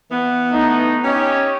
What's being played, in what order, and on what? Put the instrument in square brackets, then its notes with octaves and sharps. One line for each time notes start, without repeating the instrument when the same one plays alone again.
[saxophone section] E3 B3
[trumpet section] A3 D#4
[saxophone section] C#4 [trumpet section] D#4 G4 C#5